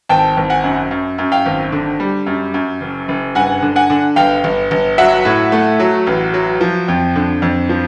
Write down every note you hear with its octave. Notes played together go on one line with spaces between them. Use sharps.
G#1 G5 A5
G#1
F#5 G#5
F#2
F#2
F#2
F5 G5
G#1
D3
G3
F#2
F#2
F#1
F#1
G2 F#5 G#5
D3
F#5 G#5
D3
G1 F5 G5
G1
G1
F#3 E5 F#5
A2
A3
F#3
A1
F#3
F3
F2
D3
F2
F3